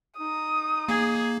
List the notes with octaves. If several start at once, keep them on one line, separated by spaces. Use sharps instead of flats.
D#4 D#6
A#3 G#4